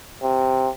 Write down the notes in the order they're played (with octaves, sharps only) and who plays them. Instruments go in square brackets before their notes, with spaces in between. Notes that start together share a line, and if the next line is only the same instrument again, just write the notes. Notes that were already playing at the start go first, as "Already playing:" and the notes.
[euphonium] C3